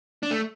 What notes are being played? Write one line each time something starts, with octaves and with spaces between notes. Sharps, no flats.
D4
A3